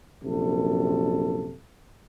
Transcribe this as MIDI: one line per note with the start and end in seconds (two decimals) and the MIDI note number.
0.22 1.55 34
0.22 1.55 42
0.22 1.55 48
0.22 1.55 69